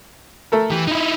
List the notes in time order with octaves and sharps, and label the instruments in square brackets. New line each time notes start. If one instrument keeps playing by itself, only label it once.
[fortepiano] A3 A4 A#4
[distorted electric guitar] E3 [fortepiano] G4
[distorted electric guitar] D#4 E4